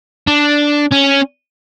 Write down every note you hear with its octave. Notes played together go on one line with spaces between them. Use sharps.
D4
C#4